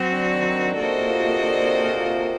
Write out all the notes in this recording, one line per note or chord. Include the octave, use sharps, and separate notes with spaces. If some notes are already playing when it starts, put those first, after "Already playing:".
Already playing: F#3 C4 F#4
D3
D#3
D3
C3 A#3 F#4 A4 C5 D#5
A#2
C3
D3
C3
A#2
C3